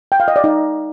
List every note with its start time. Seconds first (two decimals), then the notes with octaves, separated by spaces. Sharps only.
0.12 G5
0.20 F5
0.28 D#5
0.36 D5
0.44 D#4